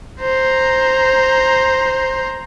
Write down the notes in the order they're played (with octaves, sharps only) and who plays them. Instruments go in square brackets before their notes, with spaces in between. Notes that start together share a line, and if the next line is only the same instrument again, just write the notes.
[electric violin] C5 A#5